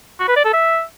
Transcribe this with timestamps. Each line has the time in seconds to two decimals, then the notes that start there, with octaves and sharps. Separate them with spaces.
0.19 F#4
0.28 B4
0.36 D5
0.45 A4
0.53 E5